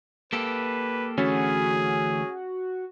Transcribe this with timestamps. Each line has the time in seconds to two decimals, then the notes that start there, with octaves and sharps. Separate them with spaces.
0.33 A#3 G4 A4 B4
1.18 D2 E3 A3 C#4 F#4 G#4